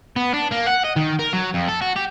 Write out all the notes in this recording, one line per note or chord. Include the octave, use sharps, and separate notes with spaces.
B3
D4
A#3
F#5
D#5
D#3
A#4
F#3
F2
A4
F#4
G4